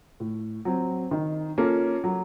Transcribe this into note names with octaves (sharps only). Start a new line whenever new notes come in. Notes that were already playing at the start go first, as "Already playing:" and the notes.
A2
F#3 C4
D#3
A#3 C#4 F4 A4
F#3